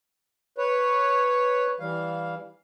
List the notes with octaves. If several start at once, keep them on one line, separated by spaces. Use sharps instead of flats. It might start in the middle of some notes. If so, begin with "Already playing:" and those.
B4 C#5
E3 G3 F5